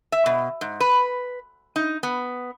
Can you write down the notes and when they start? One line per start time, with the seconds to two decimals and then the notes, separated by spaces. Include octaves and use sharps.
0.12 E5
0.26 B2
0.61 G#2
0.80 B4
1.76 D#4
2.03 B3